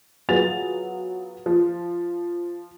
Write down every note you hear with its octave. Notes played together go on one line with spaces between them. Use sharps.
F#3 B3 F4 G#4 A6 F7
F3